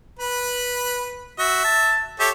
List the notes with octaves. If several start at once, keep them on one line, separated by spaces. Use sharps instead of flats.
B4 B5
F#4 E5
A5
G4 A4 C#5 E5